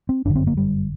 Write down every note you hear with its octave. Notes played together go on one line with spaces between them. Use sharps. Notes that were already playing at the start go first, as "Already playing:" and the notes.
C4
G1 F#2 D3 D4
C4
A#3
G3